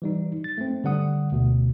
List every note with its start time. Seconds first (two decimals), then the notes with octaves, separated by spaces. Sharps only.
0.02 E3 G3 D#4
0.44 A6
0.58 A3 C4
0.84 D3 G3 F#5 D#6
1.32 D2 B2